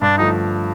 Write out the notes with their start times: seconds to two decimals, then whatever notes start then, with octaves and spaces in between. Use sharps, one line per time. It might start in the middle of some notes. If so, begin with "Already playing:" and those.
0.02 G2 D4
0.18 D3 F3 A3 D#4